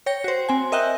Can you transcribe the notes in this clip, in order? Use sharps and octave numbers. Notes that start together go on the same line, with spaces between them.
C#5 G5 A#6 C#7
F#4 C5
C4 G#5
A#4 D#5 E5 G5 F#6